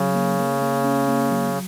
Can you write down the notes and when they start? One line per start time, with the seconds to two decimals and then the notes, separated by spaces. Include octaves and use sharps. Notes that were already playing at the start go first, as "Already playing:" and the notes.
Already playing: C#3 F#3
0.15 A#3
0.39 A#3
0.62 A#3
0.84 C#4
1.08 A#3
1.31 F#3